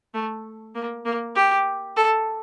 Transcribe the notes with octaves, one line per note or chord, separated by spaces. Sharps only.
A3
A#3
A#3
G4
A4